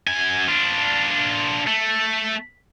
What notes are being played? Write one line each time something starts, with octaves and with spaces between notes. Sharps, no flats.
F#2 G#5
D4 F4
A3